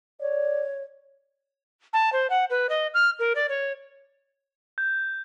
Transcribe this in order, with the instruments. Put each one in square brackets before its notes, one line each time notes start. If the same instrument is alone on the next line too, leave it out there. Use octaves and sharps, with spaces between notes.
[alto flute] C#5 [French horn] D5
[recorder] A5
C5
F#5
B4
D#5
F6
A#4
D5
C#5
[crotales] G6